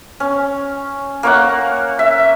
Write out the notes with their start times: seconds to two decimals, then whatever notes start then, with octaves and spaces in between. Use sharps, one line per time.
0.20 C#4
1.23 A#3 C#5 F#5
1.99 E5